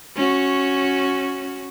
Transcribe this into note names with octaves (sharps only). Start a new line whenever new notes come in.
C#4 F#4